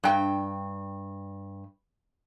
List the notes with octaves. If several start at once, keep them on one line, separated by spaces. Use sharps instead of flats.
G2 G5